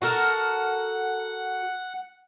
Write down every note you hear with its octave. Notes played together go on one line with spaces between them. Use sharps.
F#4 A4 A#4 F#5